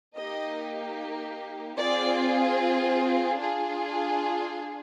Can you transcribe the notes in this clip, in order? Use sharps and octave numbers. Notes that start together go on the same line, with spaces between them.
A#3 D#4 G4 D#5
C4 F4 G#4 D5
D4 F4 G#4